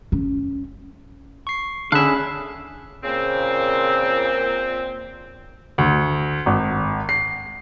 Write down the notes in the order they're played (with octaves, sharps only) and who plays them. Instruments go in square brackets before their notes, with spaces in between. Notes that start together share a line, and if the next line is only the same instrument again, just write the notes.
[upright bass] C#4
[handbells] C#6 C7
[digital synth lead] D3 [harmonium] C#4 G#4 [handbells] C#5 B5 F#6 [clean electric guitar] E5 F5
[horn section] A#2 C4 [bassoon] C#3
[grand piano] D2
G#1
C7